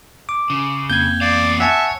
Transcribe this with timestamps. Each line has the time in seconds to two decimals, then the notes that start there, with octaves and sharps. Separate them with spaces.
0.29 D6
0.50 C#3
0.90 F2 A#3 C4 G6 G#6
1.21 E2 D5 F5
1.60 C#5 E5 F#5 G#5 A5